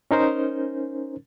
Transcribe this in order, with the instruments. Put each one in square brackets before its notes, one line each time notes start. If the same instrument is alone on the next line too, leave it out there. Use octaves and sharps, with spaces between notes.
[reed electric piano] C#4 D#4 A#4 C5